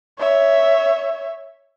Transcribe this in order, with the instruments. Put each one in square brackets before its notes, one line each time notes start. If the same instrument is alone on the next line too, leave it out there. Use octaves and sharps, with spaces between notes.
[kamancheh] C#5 E5